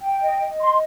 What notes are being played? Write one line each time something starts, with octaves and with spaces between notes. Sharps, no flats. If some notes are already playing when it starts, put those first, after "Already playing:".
G5
D#5
D#5
C6